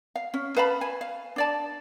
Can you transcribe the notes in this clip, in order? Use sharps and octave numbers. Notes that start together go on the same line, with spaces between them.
F5
C#4
B4 F5 A5 B5
G#5
F5
D4 D5 A5